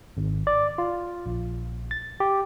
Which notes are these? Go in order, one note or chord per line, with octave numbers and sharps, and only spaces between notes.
G#1
D5
F4
A#1
A6
G4